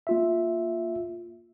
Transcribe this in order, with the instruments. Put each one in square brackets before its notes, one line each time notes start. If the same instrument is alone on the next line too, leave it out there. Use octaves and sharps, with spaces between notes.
[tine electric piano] A#3 F4 E5